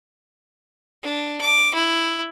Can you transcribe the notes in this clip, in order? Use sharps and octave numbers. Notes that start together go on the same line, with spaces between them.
D4
D6
E4